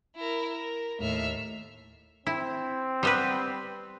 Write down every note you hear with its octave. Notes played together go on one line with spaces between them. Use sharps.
E4 A#4
A#4
D#2 A2 E5 F6
C4 E4
G3 B3 B4